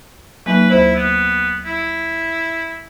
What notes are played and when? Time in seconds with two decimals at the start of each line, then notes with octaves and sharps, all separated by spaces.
0.46 F#3 A#3 D#4 B4
0.70 D2 E4 C5
0.95 B3
1.65 E4